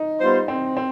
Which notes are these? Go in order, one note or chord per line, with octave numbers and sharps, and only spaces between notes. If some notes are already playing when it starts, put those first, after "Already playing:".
Already playing: D#4
G3 B3 F4 C5
C4
C4